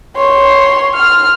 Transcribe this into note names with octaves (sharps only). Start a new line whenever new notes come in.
C#5 C6
F6